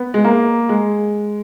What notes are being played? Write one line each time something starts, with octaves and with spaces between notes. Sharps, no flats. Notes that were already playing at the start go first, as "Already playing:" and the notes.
Already playing: B3
G#3
A#3
G#3